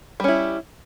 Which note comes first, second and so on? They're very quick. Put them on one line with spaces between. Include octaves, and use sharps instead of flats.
G3 C#4 E4